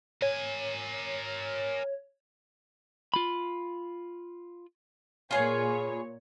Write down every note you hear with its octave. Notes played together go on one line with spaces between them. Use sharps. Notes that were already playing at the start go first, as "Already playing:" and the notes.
A#4 C#5 G#5
F4 B5
A#2 F4 G#4 B4 C#5